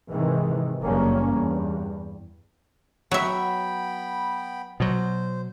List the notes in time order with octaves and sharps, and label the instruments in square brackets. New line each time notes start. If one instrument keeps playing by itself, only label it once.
[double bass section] G#2 C3 D#3 E3 G#3
F#1 G2 A#3 C#4
E2 G2
[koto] F#3 E5 [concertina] B3 G5 B5
[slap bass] B2 F#3 [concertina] C5